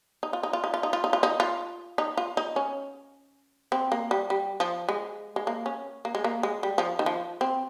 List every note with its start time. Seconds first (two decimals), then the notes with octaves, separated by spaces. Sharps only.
0.23 D#4
0.33 F4
0.43 D#4
0.53 F4
0.64 D#4
0.74 F4
0.83 D#4
0.93 F4
1.04 D#4
1.13 F4
1.23 D#4
1.40 F4
1.98 D#4
2.17 F4
2.37 D#4
2.56 C#4
3.72 C4
3.92 A#3
4.11 G3
4.30 G3
4.60 F3
4.89 G#3
5.36 G#3
5.47 A#3
5.66 C#4
6.05 A#3
6.15 G#3
6.24 A#3
6.43 G#3
6.63 G3
6.78 F3
6.99 D#3
7.06 F3
7.41 C4